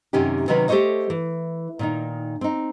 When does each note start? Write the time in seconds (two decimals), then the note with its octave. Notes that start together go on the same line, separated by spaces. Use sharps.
0.13 F#2 C3 D#3 C#4 D#4 G4
0.48 C3 D#3 F#3 C#4 D#4 B4
0.69 A3 G4 A4 C5 C#5 D#5
1.10 E3
1.79 A#2 D#3 D#4
2.41 C4 D#4